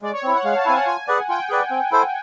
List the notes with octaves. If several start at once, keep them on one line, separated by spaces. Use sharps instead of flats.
G#3 D5
C#5
C4 E4
F#5
G#3 F5
A5
C4 E4 G#5
F#5
F4 G#5
G#4 B4 D5 F#5
F4 G5
G#4 B4 D5
C4
E4 A4 C5